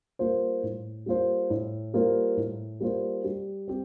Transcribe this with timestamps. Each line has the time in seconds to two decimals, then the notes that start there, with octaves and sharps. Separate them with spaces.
0.19 G3 A#3 F4 C5
0.63 A2
1.06 G3 A#3 F4 C5
1.50 A2
1.94 G3 A#3 F4 C5
2.37 A2
2.80 G3 A#3 F4 C5
3.24 G3
3.68 C4 G4